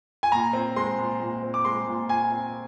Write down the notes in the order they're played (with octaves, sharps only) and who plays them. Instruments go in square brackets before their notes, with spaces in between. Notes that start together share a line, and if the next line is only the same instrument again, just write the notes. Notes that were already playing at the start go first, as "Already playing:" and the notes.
[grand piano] G#5
A#2 A#5
C4
G#3 C6
A#2
A#2
C4
D6
G#3 C6
A#2
A#2 G#5
C4